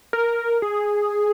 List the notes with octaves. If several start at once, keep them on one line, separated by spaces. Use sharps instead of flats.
A#4
G#4